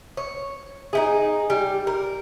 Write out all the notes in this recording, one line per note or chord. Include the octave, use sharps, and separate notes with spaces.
C#5
D#4 E4 G#4
G3
A#4